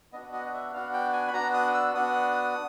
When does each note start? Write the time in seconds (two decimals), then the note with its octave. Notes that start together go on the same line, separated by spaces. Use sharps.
0.13 B3 D4 F#4 D#5
0.33 D#5
0.46 D#5
0.54 E5
0.73 B3 D4 F#4 F5
0.93 G5
1.13 G#5
1.28 B5
1.33 B3 D4 F#4 A#5
1.54 D#6
1.74 E6
1.94 B3 D4 F#4 D#6